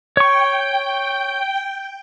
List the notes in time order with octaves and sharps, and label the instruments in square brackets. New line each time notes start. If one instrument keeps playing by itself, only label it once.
[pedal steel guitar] C#5 C#6 [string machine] G5